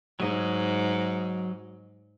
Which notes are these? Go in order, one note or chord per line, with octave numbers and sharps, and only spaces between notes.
G#2 F#3 D#5